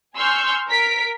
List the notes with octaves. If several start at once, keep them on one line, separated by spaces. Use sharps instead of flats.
G#5 C6 C#6 E6 F6 G6
A#4 B6 D7